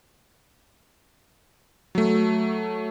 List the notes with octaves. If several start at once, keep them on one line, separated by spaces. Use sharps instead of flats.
F#3 A3